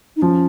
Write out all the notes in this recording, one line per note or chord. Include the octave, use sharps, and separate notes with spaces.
D#4
F3 C#4